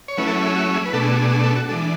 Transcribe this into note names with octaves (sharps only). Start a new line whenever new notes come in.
C#5
F#3 A3 C#4 E4 B4
A4
G#4
F#4
G#4
B4
B2 A3 D4 A4
G#4
F#4
G#4
G#4
A4
F#4
E3 G#3 D4 A4